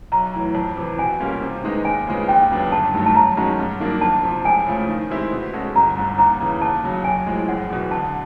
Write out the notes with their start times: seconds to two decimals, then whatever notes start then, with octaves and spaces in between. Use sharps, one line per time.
0.12 B1 A#5
0.33 A2 E3
0.55 F2 A5
0.77 C3 E3
0.98 B2 G#5
1.20 G3 A#3 C#4 F4
1.42 C3
1.64 D#3 G#3 B3 D#4
1.85 D#2 G#5
2.07 C#3 F3 G#3 B3
2.28 D#2 G5
2.50 C#3 F#3 B3 D4
2.72 G1 A5
2.94 G2 D#3 F#3 A3
3.06 A5
3.15 F#2 A#5
3.37 D#3 G#3 C#4 F#4
3.59 G2
3.80 D#3 F#3 A#3 D4
4.01 F2 A5
4.23 C3 F3
4.45 C#2 G#5
4.67 C#3 F3 A3
4.89 D#3
5.10 G#3 C4 E4 G4
5.32 B2
5.53 G#3 C#4 F#4 A4
5.75 G1 A#5
5.97 G2 D3
6.18 D#2 A#5
6.40 C#3 E3
6.61 D#2 A5
6.83 C#3 F#3
7.04 B1 G#5
7.26 A2 F3 G#3
7.49 F#1 F#5
7.69 E2 B2
7.91 D3 A5